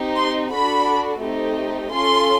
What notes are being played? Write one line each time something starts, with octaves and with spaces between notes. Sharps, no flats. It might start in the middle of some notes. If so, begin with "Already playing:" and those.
Already playing: C4 D#4 G4
C6
D4 F#4 A4 B5
A3 C4 D#4 G4
C#4 F4 A4 C6